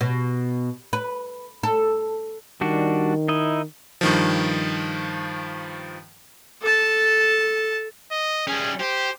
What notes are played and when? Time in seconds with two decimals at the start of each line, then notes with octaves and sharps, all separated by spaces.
0.01 B2
0.93 B4
1.63 A4
2.61 D#3 G3 D4 F#4
3.28 D#4 E4 D#5
4.01 G2 D#3 F3
6.61 A4 A5
8.11 D#5
8.47 G3 C#4 G#4
8.80 G4 C5